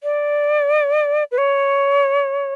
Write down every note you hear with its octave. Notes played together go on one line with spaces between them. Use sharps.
D5
B4
C#5